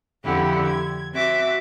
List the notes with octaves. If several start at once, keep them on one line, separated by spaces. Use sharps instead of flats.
F2 D3 E4 G4 F#5
G#6
C4 F#4 E5 D6